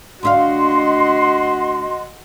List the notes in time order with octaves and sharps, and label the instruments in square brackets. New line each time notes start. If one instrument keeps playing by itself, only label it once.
[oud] D2 D#4 F5 [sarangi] F#4 [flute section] D#5 C6